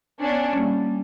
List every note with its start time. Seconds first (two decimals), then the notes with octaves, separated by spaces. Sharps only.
0.20 B3 C#4 D4
0.53 G3 A#3 C#4